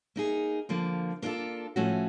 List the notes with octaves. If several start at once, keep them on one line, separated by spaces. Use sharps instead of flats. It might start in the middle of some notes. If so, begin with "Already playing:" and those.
A#3 D#4 G#4
D3 F3 A#3
A#3 D4 F4 A4
A2 F3 A3 C#4 F#4